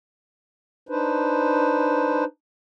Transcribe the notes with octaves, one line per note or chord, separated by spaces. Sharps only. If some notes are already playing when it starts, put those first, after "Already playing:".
D4 D#4 B4 C5